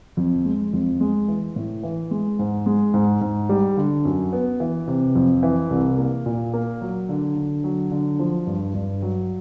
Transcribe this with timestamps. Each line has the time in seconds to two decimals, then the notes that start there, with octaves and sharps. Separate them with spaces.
0.17 F2
0.45 G#3
0.73 F2
1.00 G#3
1.28 E3
1.56 A2
1.83 E3
2.11 G#3
2.39 G#2
2.66 G#3
2.94 G#2
3.21 G#2
3.49 G3
3.77 D3
4.05 F#2
4.33 B3
4.60 E3
4.88 C3
5.15 F2
5.43 E3
5.71 C2
5.98 A#3
6.26 A#2
6.53 A#3
6.81 F#3
7.09 D3
7.36 D3
7.64 F#3
7.92 D3
8.19 F3
8.47 G2
8.74 G2
9.02 F#3